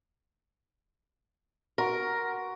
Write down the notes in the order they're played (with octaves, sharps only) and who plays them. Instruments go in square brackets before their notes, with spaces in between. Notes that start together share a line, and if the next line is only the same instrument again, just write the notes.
[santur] F#4 C6 [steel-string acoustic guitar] A#4